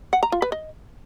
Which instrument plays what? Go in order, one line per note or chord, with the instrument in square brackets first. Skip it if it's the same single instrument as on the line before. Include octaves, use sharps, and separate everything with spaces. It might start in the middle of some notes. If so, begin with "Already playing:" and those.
[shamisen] F#5
A#5
F4
B4
D#5